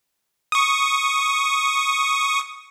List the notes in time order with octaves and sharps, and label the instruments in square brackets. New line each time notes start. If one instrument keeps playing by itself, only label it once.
[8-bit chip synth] C#6 D#6